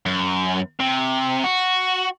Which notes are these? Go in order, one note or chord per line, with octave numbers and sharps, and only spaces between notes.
F#2
C3
F#4